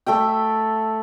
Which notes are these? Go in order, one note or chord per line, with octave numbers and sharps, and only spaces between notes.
A3 A4 E5 G5